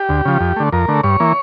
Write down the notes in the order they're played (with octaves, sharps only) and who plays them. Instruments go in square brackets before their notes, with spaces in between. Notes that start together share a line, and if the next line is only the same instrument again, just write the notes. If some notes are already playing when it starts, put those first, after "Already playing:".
Already playing: [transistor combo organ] G4
D2
C#3 F3
F2
D3 A3
F2 A#4
D3 A3
G2 C#5
E3 A#3